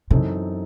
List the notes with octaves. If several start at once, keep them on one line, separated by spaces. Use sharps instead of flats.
F#2 C3 E3 C4 D#4 A4